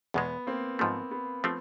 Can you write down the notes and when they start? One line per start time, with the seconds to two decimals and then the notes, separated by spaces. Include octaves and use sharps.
0.14 E2 B2 G#3 B3
0.47 A#3 C4
0.79 G#2 F3 A3 B3
1.11 B3
1.44 F3 A3 B3 C4